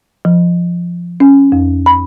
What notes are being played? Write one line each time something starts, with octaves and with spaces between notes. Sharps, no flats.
F3
C#4
F2
B5